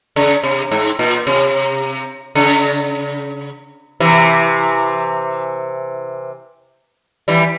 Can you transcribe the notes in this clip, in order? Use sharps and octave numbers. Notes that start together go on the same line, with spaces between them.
C#3
C3
G#2
A#2
C3
C#3
C3 E3
E3 G3